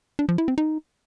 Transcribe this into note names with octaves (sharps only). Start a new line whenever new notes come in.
D4
F3
E4
C4
D#4